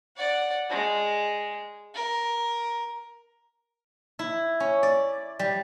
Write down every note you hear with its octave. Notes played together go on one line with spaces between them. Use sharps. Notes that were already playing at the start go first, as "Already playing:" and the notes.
D5 F#5
G#3
A#4
E4
C#4
D5
G3